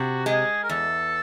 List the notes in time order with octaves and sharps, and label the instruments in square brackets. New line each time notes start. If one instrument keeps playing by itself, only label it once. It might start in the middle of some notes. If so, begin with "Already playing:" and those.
Already playing: [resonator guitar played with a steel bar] C3 [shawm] F#4
[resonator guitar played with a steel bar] G#3 [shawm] G#4
[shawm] A#4
[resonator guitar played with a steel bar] E2 [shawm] A4